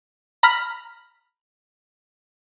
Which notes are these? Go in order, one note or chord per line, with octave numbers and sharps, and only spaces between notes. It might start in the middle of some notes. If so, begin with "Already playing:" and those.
A#5 B5 F6 B6